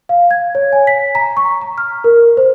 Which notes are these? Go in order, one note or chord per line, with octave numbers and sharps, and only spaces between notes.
F5
G#6
C#5
G#5
B6
A#5
C#6
A#5
F6
A#4
C5